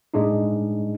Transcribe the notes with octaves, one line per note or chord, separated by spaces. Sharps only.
A2 G#3 D4 D#4